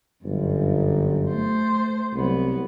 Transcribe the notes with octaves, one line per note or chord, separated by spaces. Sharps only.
G1 F#2
A3 C5
C2 F#3 B3